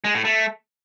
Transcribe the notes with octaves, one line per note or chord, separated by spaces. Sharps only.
G#3
A2
A3